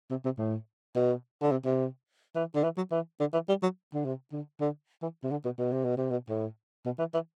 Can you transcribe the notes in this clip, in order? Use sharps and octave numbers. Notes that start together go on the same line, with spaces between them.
C3
C3
A2
B2
D3
C3
C3
E3
D3
E3
F#3
E3
D3
E3
G3
F#3
D3
C3
D3
D3
E3
C3
D3
B2
B2
C3
B2
C3
B2
A2
B2
E3
E3